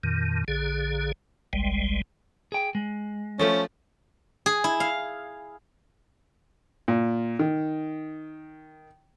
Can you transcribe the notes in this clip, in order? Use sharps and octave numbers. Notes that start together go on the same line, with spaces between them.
F2 A#2 D#3
A#1 D3 G#4
G1 C2 G3 G#3
G#4 G5
G#3
F3 A3 C#4
G#4
E4
F5
A#2
D#3